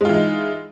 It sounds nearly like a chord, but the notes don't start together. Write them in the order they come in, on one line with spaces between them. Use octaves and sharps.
G#3 F4 E3 D#4